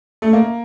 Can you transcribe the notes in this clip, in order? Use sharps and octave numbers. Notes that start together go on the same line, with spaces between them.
A3
A#3